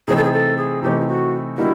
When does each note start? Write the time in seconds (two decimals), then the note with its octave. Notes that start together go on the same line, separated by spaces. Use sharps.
0.08 C3 E3 A3 C4 D#4 G#4
0.17 A4
0.24 G#4
0.32 A4
0.57 G#4
0.83 C3 E3 A3 C4 D#4 G4
1.01 F4
1.07 F#4
1.58 D3 G3 A#3 D#4 E4 F#4